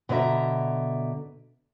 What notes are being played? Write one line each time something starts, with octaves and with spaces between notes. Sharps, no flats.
B2 D3 B4 D#5 E5 A#5